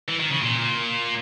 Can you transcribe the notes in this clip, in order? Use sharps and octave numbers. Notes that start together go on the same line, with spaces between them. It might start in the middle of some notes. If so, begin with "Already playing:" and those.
E3
D#3
C#3
A#2